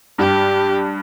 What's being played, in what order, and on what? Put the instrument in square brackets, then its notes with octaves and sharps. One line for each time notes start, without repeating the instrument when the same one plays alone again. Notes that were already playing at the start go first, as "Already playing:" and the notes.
[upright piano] G2 [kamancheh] G4